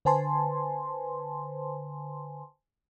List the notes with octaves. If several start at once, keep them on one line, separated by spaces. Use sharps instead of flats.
D3 B4 C5 G#5 A5 C6